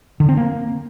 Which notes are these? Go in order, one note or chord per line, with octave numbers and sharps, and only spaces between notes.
D3
C4
A#3